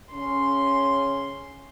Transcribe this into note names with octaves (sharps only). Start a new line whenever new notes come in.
C#3 C#4 C6